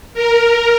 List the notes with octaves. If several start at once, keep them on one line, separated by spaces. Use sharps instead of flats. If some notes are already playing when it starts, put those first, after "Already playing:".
A#4